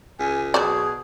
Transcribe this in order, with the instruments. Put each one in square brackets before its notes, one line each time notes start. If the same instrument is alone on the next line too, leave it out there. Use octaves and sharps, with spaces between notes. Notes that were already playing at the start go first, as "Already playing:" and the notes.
[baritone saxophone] C#2 [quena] G#5
[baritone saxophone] B2 [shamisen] F#3 C5 D5 [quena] G#4